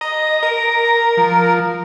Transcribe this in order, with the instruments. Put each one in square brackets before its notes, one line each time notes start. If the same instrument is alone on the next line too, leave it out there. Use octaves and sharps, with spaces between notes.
[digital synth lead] D#5 [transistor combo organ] A#5
[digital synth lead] A#4
[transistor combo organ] F3